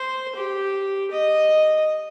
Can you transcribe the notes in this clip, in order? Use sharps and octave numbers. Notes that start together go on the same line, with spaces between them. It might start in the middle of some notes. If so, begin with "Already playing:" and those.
Already playing: C5
G4
D#5